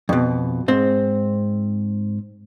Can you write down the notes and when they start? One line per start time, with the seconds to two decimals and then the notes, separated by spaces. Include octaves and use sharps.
0.09 F2 B2
0.68 G#2 C4